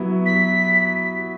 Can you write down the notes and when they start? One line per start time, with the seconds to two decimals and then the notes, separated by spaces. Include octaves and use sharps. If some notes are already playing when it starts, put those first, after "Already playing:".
Already playing: F#3 B3 E4
0.26 B6